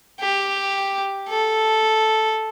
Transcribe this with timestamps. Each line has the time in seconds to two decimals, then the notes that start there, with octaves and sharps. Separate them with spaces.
0.20 G4
1.29 A4